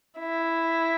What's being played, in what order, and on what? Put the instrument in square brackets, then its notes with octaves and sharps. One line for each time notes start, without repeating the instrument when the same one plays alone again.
[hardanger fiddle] E4